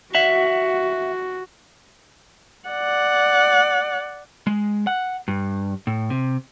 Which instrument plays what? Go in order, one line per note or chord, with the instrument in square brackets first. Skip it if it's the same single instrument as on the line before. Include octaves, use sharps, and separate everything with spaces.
[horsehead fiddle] F#4 [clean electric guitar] E5 F#5
[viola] D5 F#5
[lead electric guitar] G#3
F#5
G2
A2
C3